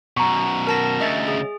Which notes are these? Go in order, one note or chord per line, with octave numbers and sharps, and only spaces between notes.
F#2 B2 A#5 C#6
A#4 A5 A#6
D2 C#3 D#5 E5 A6
G#4